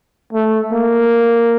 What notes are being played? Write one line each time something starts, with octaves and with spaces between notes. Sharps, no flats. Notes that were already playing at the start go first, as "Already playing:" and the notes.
A3
A#3